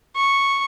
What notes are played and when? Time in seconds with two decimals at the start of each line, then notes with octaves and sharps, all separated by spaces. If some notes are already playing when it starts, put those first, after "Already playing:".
0.16 C#6